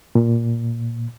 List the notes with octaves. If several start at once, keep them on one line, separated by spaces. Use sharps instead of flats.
A#2